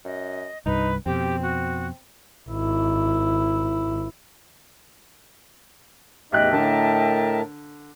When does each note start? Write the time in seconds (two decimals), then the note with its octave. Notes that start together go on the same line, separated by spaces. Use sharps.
0.05 F#2 D#5
0.66 C2 G2 D#4 B4
1.06 F2 B2 C4 G4
1.42 F#4
2.49 G#1 E4
6.32 A1 E2 D#4 D#5 E5 G5 F#6
6.52 A2 D3 A#4 A5